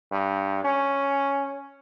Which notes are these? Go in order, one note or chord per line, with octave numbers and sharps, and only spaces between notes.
G2
C#4